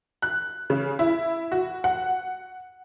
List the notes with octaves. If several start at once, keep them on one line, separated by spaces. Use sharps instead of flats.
F#6
C#3
E4
F#4
F#5